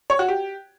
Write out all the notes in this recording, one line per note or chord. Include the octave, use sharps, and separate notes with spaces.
C#5
F#4
G4